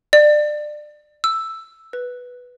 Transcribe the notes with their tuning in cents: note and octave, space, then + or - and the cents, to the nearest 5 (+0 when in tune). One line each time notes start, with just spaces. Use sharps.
D5 +25
E6 +5
B4 +0